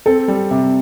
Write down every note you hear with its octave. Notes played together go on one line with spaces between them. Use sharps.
C4 A4
G3
C3